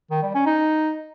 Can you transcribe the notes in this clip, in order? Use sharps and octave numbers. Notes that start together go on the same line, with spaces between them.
D#3
G3
C#4
D#4